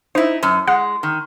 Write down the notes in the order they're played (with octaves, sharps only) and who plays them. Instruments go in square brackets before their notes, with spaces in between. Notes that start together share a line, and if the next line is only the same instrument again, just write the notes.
[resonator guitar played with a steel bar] D#4 E4 [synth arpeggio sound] C5
[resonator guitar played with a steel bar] F#2
[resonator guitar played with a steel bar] G#3 [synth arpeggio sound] F#5
[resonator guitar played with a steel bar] D#3